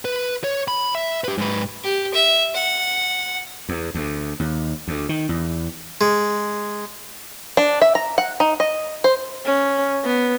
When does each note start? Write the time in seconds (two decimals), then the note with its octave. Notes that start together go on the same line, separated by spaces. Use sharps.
0.05 B4
0.44 C#5
0.68 B5
0.95 E5
1.24 G4 B4
1.38 G#2 B4
1.84 G4
2.14 E5
2.55 F#5
3.69 E2
3.95 D2
4.40 D#2
4.88 D2
5.09 D#3
5.29 E2
6.01 G#3
7.57 D4
7.82 E5
7.95 A#5
8.18 F#5
8.40 D#4
8.60 D#5
9.04 C5
9.45 C#4
10.04 B3